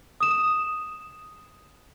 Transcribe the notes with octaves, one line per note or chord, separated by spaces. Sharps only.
D#6 E7